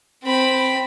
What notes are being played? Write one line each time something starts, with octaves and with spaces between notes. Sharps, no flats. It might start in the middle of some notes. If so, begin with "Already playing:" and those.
C4 B5